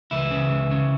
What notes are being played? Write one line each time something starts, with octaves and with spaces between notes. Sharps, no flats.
C#2 E3 E4
C#3
C#2
C#3